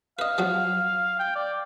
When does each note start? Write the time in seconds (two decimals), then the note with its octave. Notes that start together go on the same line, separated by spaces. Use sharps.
0.19 B4 D#5 F5
0.38 F3 F#3 F#4
1.19 G5
1.36 D5